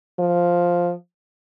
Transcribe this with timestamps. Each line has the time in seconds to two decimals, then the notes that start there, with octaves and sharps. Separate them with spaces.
0.19 F3